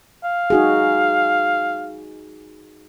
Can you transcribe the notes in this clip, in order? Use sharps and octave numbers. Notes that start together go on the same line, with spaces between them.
F5
D#4 F#4 G#4